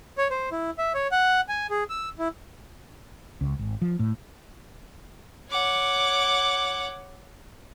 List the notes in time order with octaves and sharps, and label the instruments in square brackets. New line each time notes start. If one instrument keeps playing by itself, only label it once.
[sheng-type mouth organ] C#5
C5
E4
E5
C#5
F#5
G#5
G#4
E6
E4
[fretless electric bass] C#2
G#1
F3
A2
[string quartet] C#5 F#5 D6